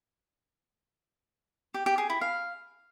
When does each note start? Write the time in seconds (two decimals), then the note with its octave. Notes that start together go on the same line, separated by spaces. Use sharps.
1.74 G4
1.86 G4
1.98 G#4
2.10 E4
2.21 F5